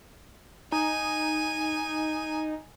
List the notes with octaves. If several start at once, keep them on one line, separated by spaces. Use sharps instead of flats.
D#4 G#5